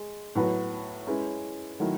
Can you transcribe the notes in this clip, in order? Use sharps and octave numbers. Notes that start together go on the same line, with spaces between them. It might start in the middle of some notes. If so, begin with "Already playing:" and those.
Already playing: G#3
A2 F#3 B3 F#4 B4
G#3 C#4 E4 B4
D#3 F#3 A3 E4